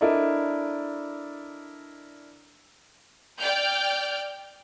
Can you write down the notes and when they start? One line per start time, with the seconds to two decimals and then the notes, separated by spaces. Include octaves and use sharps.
0.01 D4 E4 A4 A#4 D5 D#5
3.39 D5 G5 F6 G6